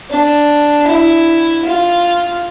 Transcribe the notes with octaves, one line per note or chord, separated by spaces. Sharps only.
D4
E4
F4